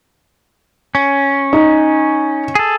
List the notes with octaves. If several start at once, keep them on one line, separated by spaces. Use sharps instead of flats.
C#4
D#4
G#4 A4